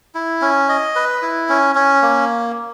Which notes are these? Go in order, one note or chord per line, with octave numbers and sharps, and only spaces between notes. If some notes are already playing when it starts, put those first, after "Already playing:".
E4
C#4
D#5
B4
E4
C#4
C#4
A#3